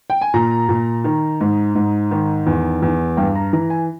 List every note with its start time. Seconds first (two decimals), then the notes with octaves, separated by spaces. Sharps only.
0.10 G5
0.21 G#5
0.34 A#2 A#5
0.69 A#2
1.04 D#3
1.41 G#2
1.75 G#2
2.11 D#3
2.46 E2
2.82 E2
3.17 G2 G5
3.35 A#5
3.53 E3 A#5
3.70 G#5